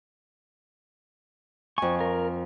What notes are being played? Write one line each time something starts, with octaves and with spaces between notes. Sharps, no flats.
F2 G#5 C#6
A#4